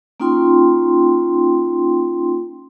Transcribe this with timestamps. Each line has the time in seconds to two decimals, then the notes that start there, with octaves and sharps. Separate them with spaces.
0.20 A#3 C#4 D#4 F4 G5 C6